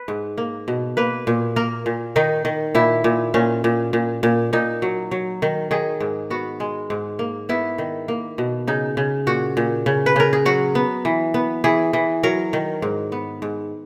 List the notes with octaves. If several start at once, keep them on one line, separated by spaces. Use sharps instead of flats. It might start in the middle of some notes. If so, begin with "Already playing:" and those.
Already playing: B4
G#2
A#3
B2
A#3 B4
A#2
A#3 A#4
A#2
D#3 D#4
D#3
A#2 E4
A#2
A#2 C#4
A#2
A#2
A#2
A#2 D#4
F#3
F#3
D#3
D#3 G#4
G#2
B3 F#4
G#3
G#2
A#3
B3 E4
D#3
A#3
B2
C#3 D#4
C#3
A#2 F#4
A#2
C#3
B4
C#3 A#4
G#4
F#3 F#4
B3
E3
B3
E3 G#4
E3
F#3 A#4
D#3
G#2
B3
G#2